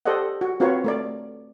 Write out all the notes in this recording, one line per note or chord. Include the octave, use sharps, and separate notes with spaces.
G4 A4 C5 D5 D#5 F#5
F#4
C4 F4 F#4 A#4 B4 C#5
A3 A#4 D5